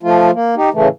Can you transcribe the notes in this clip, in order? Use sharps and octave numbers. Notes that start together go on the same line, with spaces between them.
F3 A3 F4
A#3
D#4 G4
A2 C#3 E3 A3